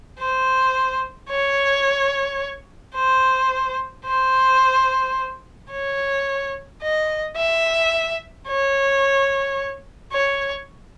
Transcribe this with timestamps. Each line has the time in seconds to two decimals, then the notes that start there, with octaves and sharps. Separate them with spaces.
0.19 C5
1.30 C#5
2.95 C5
4.05 C5
5.71 C#5
6.82 D#5
7.36 E5
8.48 C#5
10.13 C#5